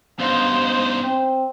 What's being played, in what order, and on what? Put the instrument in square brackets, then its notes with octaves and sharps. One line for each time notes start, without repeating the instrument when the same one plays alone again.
[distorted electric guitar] G2 D#4 [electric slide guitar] B3 C#4 F5 [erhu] C5
[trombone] C4